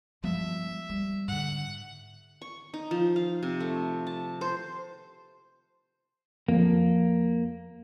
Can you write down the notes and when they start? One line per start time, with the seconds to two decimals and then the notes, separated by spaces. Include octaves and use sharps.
0.24 G2 F3 G#3 B3 E5
0.89 G3
1.28 G#2 D3 F#5
2.42 C#6
2.74 D#4
2.91 F3
3.16 F5
3.43 C3
3.60 A3
4.07 A5
4.41 C5
6.48 F2 F3 A#3